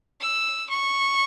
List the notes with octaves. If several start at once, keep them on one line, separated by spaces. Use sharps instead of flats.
E6
C#6